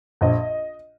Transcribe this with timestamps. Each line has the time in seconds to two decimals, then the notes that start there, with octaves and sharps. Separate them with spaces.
0.21 A#1 D#5